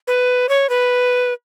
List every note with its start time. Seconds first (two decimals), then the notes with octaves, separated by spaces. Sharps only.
0.07 B4
0.49 C#5
0.69 B4